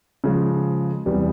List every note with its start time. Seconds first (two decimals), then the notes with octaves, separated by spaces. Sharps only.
0.24 C#3 F3 G#3
1.06 E2 C3 E3 G3 B3